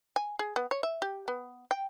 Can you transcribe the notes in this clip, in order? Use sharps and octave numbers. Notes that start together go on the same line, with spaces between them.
G#5
G#4
B3
C#5
E5
G4
B3
G5